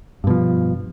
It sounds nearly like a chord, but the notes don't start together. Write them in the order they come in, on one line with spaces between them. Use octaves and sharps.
G2 B2 F3